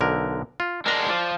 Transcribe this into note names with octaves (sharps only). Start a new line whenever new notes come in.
B1 D3 A#4
F4
G#3 D4 A#4 A#5
F3 D5